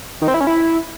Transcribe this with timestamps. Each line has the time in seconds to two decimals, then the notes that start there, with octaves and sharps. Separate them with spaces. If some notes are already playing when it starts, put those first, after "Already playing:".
0.22 D#3
0.28 C4
0.34 E4
0.41 C#4
0.47 E4